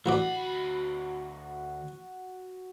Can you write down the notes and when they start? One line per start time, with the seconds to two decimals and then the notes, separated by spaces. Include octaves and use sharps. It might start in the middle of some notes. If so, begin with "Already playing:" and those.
0.06 A1 D2 G2 F#4 D5 B5